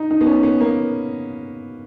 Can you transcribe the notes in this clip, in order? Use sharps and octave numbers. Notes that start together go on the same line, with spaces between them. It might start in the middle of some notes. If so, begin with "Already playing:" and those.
Already playing: D#4
D#4
B3
C#4
B3
A#3